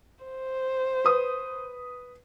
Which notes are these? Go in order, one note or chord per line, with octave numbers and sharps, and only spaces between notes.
C5
B4 D#6